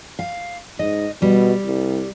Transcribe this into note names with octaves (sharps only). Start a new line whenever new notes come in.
F5
G#2 D#5
B2 G3
C2